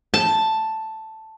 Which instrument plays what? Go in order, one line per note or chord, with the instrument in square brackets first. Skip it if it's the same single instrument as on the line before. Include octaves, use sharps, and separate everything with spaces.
[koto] A5